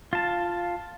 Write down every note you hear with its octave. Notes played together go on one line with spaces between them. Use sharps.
F4 A5